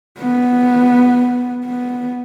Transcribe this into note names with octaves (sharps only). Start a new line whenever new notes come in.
B3
B3